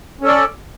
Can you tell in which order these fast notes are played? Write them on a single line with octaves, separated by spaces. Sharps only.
C#4 A4 D5